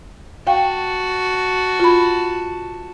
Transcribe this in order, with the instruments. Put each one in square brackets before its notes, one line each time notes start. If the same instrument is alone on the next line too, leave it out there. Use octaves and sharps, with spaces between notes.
[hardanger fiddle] F#4 A5 [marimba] F5 G5
[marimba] F4 B5